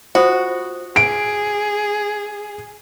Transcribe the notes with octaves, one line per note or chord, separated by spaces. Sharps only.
F4 F#4 C5 D#6
G#4 D7